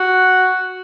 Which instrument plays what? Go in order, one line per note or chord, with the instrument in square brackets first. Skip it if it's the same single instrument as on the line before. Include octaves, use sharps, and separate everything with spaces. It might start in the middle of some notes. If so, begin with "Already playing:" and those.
Already playing: [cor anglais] F#4